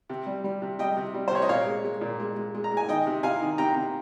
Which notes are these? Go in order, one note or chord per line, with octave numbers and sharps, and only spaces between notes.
C3
G3
G3
C3
G3 D#5 G5
C3
G3
C5
C3 C#5
D#5
A#2 C#5 F5
G#3
G#3
A#2
G#3
G#3
G#3
A#5
G#3
G#5
D#3 D#5 G5
C3
C3 F5 G#5
D#3
C3 G5 A#5
C3